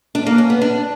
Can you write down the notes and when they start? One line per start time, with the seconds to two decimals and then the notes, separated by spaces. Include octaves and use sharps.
0.15 D4
0.26 A#3
0.38 C#4
0.50 B3
0.61 D4